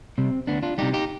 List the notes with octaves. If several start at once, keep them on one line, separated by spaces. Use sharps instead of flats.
C3 G3 C4
D2 B3 D4
D4 F4
C3 G3 D#4 G4
D#4 G4